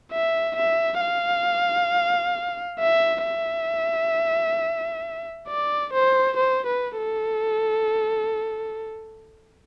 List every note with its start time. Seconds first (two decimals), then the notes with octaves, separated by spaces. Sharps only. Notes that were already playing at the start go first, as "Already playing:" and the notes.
0.12 E5
0.56 E5
1.01 F5
2.80 E5
3.24 E5
5.48 D5
5.93 C5
6.37 C5
6.67 B4
6.97 A4